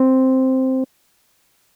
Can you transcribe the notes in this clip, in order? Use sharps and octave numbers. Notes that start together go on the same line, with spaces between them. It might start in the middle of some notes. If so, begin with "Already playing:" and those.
Already playing: C4